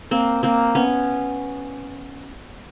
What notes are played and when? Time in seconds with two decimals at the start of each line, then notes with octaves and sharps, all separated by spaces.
0.11 A#3 C4
0.43 A#3 C4
0.75 B3 C#4